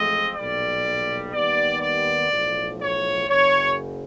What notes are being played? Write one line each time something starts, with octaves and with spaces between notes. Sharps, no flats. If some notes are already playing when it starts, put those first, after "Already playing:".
Already playing: A1 A2 F3 G#3 C4 D#5
B1 A#2 G3 D5
D#2 D#3 G3 B3 D5
D5
B1 A2 F3
C#5
F#1 F#2 C#3 C#5